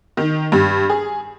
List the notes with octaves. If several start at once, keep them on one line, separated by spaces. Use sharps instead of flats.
D#3
G2
G#4